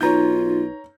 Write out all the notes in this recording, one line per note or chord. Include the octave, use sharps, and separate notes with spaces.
B1 D#4 F4 B4 C#5 A#5 G6